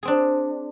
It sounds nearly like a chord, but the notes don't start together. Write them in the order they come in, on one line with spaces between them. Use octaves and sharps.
G#4 C4 D4